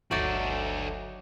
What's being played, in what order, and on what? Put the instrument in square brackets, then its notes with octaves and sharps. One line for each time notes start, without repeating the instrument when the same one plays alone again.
[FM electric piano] G1 D2 [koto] F#3 D#4 D5 [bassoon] A3 [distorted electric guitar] F#4 A4